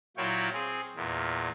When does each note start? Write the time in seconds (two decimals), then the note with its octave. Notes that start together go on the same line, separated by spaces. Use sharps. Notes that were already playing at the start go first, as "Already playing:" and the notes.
0.17 A#2 F#3 E4 F4 C#5 G5
0.53 C4 G#4
0.96 E2 A#2